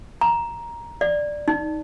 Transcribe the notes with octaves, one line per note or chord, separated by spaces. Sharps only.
A#5
D5
D#4